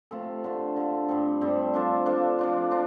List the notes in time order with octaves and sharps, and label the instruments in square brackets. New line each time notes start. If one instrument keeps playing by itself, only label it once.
[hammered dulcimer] C3 A3 F4 A4
D3 A3 F4 A4
D3 A3 F4 A4
G2 G3 C4 A4
G2 G3 C4 A4
F3 D4 F4 A4
F3 D4 F4 A4
F3 D4 F4
F3 D4 F4